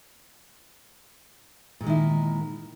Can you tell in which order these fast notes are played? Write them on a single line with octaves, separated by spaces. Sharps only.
A#2 G#3 D#3 E4